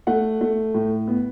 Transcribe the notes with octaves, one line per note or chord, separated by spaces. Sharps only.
A3 F#5
A3
A2
B3